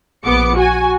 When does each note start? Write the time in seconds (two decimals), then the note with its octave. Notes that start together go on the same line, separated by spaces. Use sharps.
0.24 A#1 B3 D6 C#7
0.56 F#4 G#5